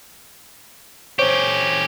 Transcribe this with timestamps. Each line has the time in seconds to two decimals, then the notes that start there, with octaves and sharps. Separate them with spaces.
1.19 C#4 G4 C5 C#5 C#6